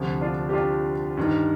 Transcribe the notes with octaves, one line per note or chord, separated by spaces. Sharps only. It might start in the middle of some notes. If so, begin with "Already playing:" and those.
Already playing: D2 C3 F3
D4 F4
G4
D4 F4
G2 D#3